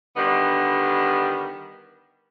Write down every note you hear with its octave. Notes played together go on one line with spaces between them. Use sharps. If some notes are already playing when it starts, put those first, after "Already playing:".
D3 D#3 G3 B3